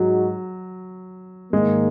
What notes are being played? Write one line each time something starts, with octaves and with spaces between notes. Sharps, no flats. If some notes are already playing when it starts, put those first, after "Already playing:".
Already playing: G#2 F#3 G#3 D#4 F#4
G#2 D#3 G#3 A#3